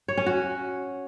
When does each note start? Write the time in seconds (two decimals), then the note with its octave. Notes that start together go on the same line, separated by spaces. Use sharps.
0.08 C#5
0.17 C#4
0.26 F#4